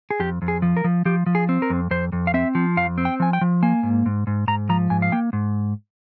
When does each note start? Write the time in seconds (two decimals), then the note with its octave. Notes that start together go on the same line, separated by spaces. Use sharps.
0.11 G#4
0.20 F2 G4
0.42 F2
0.48 G#4
0.62 F3
0.77 A#4
0.84 F3
1.05 F3 G4
1.26 F3
1.35 G#4
1.49 C4
1.62 A#4
1.70 F2
1.91 F2 C5
2.12 F2
2.27 F5
2.34 C4 E5
2.55 F3
2.77 F2 F5
2.98 C4
3.05 G5
3.20 F3 G#5
3.33 G5
3.41 F3
3.63 A#3 G#5
3.83 G#2
4.06 G#2
4.27 G#2
4.48 G#2 A#5
4.69 F3 A#5
4.90 G#2 G#5
5.02 F5
5.12 A#3 G5
5.33 G#2